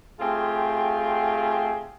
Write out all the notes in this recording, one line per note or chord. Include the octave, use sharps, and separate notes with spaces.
A3 C4 F4 G4 G#4